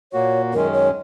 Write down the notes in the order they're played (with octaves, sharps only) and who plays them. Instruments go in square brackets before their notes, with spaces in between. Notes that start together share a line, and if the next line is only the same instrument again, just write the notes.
[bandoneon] A#2 A#3 F#4 [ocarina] C#5
[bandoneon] F#2 D#3 G#3 C#4 [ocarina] A#4
[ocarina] C#5